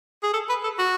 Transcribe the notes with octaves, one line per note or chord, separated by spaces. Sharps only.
G#4
A4
B4
A4
F#4